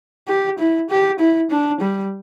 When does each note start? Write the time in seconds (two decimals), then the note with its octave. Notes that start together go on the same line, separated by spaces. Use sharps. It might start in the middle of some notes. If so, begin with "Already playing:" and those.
0.28 G4
0.59 E4
0.90 G4
1.19 E4
1.50 D4
1.80 G3